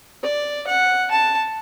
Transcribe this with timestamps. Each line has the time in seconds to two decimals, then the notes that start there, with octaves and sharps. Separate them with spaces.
0.23 D5
0.67 F#5
1.11 A5